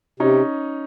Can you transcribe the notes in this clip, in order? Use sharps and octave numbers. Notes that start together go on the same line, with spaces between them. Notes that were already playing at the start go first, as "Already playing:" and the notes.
C3 C#4 D#4